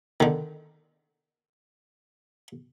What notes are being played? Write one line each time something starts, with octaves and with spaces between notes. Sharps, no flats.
D3 D#3